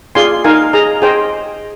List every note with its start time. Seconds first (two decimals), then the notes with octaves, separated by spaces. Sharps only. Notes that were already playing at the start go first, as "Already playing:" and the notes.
0.15 F4 G#4 D5 G#5 C6
0.44 D#4 A#4 F5 G#5
0.73 G#4 D#5 A#5
1.02 G#4 C5 D#5 G5